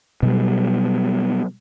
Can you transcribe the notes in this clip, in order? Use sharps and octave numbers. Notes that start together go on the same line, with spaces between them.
B2 F#3 G3